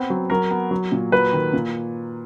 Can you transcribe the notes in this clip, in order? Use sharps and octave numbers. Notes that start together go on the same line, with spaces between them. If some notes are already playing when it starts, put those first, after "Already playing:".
Already playing: B3 C4
F#3
F#3 A#4
B3
F#3
A#2
F#3 B4
D#3
A#2